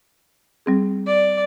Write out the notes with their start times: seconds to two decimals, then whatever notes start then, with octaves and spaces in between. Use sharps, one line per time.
0.66 G3 C4 G#4
1.07 D5